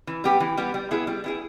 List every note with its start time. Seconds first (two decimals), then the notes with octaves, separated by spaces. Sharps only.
0.07 E3
0.24 G3 B3 G4
0.40 E3
0.57 G3 B3 G4
0.74 G3
0.91 B3 E4 G#4
1.07 G3
1.24 B3 E4 G#4